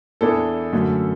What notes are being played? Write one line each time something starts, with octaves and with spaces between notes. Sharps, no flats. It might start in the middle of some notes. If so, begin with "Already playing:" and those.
E2 E3 D4 A4
F#2 D3 A3